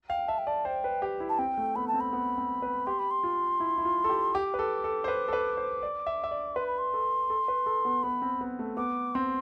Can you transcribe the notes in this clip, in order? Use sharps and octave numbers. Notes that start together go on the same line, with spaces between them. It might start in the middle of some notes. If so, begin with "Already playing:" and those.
F5 G5
E5 A5
G5
D5 A5
C5 G5
B4
G4
E4
A5
C4 G5
A3
B3 B5
A5
C4
B5
B3
C4
B4
G4 C6
B5
C6
F4
E4
E4
F4
A4
G4
G4 D6
B4
A4
A4
C5
B4
A4
B4
C5
D5
E5
E5
D5
B4 C6
B5
C6
A4
A4
B4
A4
B3
B3 B5
C4
B3
A3
B3 D6
C4 C6